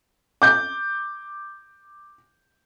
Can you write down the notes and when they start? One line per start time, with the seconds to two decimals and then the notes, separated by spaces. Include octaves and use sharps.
0.42 D6 G6